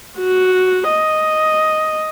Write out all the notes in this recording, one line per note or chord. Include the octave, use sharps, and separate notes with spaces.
F#4
D#5